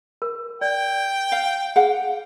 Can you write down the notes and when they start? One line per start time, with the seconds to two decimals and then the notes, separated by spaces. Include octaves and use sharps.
0.22 A#4
0.61 D5 G5
1.32 F5
1.76 G#4 F5 F#5